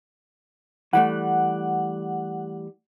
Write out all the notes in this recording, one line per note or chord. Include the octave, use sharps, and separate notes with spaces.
E3 G3 A3 F#5